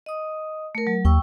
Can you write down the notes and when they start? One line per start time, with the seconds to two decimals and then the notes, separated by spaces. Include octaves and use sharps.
0.06 D#5 D#6
0.75 A3 A#4
0.87 F#3
1.05 D#2 G5 C#6 E6